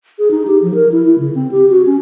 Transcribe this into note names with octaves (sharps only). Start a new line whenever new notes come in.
G#4
D#4
G4
F3
A#4
E4
E4
C#3
C4
G4
F#4
C#4